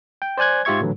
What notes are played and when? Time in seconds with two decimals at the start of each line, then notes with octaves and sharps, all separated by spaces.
0.22 G5
0.38 C5 D5 G#5 F#6 G#6
0.65 G#2 F4 G4 E5 C#6 G#6
0.81 A2 D3 E3 F#3